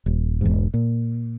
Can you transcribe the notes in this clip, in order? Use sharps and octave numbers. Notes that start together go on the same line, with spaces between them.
D#1
E1 E2 G#2
A#2